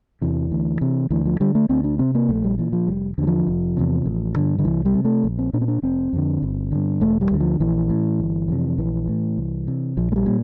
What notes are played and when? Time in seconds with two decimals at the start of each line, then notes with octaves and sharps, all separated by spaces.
0.22 E2 C3 E3
0.52 D2
0.81 C3
1.11 D2 E3
1.26 F3
1.40 D3 G3
1.55 A3
1.69 D2 C4
1.84 D4
1.99 C3 C4
2.15 A#3
2.29 A#1 A3
2.44 G3
2.59 A#2 E3
2.73 F3
2.87 F1 G3
3.18 E2 D3
3.23 G3
3.27 F3
3.47 F1
3.77 E2 C3
4.05 A1
4.36 G2 D3
4.59 D3
4.64 C2 E3
4.85 G3
4.94 C3
5.05 A3
5.24 A#1
5.39 C4
5.53 A#2 D4
5.61 C4
5.68 D4
5.82 F1 C4
6.13 F2 D3
6.42 G1
6.72 G2 D3
7.01 E1 A3
7.21 G3
7.31 D2 D3
7.41 F3
7.60 A#1 E3
7.90 A2
8.20 G1
8.48 F2 C3
8.78 A#1 E3
9.08 A2
9.38 C2
9.67 C3
9.97 A#1 F3
10.12 A3
10.16 G3
10.26 A#2